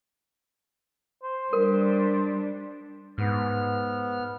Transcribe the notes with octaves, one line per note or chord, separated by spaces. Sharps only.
C5
G3 D4 A#4
G#2 B3 F6